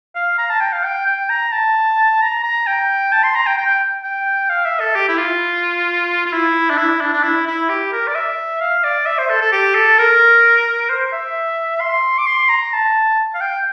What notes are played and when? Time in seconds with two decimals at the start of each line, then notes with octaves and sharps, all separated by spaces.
0.15 F5
0.38 A#5
0.49 A5
0.60 G5
0.72 F5
0.84 G5
1.06 G5
1.29 A#5
1.52 A5
2.21 A#5
2.43 A#5
2.67 G5
3.12 A5
3.23 C6
3.35 A#5
3.46 G5
3.57 G5
4.03 G5
4.49 F5
4.65 E5
4.80 A4
4.95 G4
5.09 E4
5.17 F4
6.26 F4
6.32 E4
6.70 D4
6.78 E4
7.01 D4
7.13 D4
7.23 E4
7.47 E4
7.69 G4
7.92 A#4
8.07 D5
8.15 E5
8.61 F5
8.84 D5
9.06 E5
9.18 C5
9.29 A4
9.41 A4
9.52 G4
9.75 A4
9.98 A#4
10.90 C5
11.13 E5
11.81 C6
12.18 D6
12.26 C6
12.49 A#5
12.73 A5
13.34 F5
13.41 G5